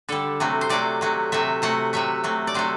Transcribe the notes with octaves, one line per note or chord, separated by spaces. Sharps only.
D3 G3 A4
C3 F#3 A3
C5
C3 F#3 A3 D5
C3 F#3 A3
C3 F#3 A3 E5
C3 F#3 A3 F#5
C3 F#3 A3 E5
C3 F#3 A3
D5
C3 F#3 A3 C5